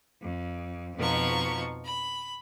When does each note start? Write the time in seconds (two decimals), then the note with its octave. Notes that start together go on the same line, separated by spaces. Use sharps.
0.22 F2
0.97 F2 B2 F3 D#4 C#6
1.84 B5